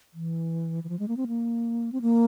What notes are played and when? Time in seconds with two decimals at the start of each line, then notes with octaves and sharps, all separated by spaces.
0.14 E3
0.84 E3
0.89 F3
0.99 G#3
1.08 A#3
1.17 C4
1.27 A#3
1.92 C4
2.02 A#3